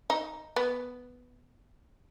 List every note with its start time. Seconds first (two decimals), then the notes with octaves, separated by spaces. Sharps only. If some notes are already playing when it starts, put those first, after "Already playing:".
0.10 D#4
0.56 B3